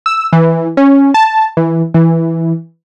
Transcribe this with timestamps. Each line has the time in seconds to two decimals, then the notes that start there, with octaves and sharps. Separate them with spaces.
0.06 E6
0.33 E3
0.77 C#4
1.14 A5
1.57 E3
1.94 E3